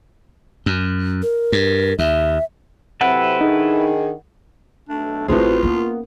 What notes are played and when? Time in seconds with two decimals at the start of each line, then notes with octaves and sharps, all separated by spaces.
0.66 F#2
1.22 A#4
1.52 G2
1.99 D#2 E5
3.01 C3 F#3 C4 E4 A4 B4 F#5
3.41 D#3 D4 D#4 G#4
4.89 B1 A3 D4
5.28 G#1 A2 C4 F4 F#4 G#4 B4 C5
5.63 A#3 B3 C#4 D#4